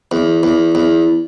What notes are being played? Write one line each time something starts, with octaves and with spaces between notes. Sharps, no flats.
E2
E2
E2